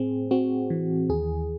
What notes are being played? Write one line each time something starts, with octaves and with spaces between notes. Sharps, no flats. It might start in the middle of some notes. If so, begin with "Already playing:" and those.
Already playing: A2 C4 G#4
C4 F#4
E3
D#2 G#4